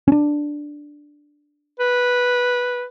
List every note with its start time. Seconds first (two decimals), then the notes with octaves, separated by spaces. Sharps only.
0.08 C#4 D4
1.80 B4